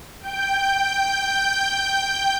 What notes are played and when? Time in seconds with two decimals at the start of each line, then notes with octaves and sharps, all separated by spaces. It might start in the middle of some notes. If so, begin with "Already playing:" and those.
0.21 G5 G6